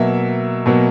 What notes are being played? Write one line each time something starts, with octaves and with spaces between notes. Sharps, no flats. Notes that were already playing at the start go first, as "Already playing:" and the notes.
Already playing: B2 F#3 A#3 E5
B2 F#3 A#3